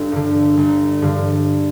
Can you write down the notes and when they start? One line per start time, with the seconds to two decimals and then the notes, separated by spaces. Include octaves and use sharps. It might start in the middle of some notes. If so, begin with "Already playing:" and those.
Already playing: G1
0.12 G2 D3
0.57 G1
1.02 G2 D3